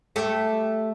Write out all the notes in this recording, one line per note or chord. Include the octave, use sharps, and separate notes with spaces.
A3 G4